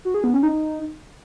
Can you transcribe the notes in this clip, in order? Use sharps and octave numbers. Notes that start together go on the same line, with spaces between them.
F#4
G#4
B3
C#4
D#4